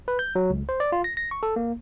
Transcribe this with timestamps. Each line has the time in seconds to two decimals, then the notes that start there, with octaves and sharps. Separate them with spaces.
0.08 B4
0.19 G6
0.35 F#3
0.50 C#2
0.69 C5
0.80 D5
0.92 F4
1.04 A#6
1.17 A#6
1.31 C#6
1.43 A4
1.56 A#3